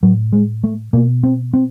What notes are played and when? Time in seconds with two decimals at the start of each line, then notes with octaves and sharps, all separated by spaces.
0.03 A2 F#3
0.33 G#3
0.64 A3
0.93 B2 A#3
1.23 C4
1.53 C4